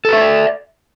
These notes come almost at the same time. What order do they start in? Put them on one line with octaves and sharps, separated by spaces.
A4 B4 E5 C5 D5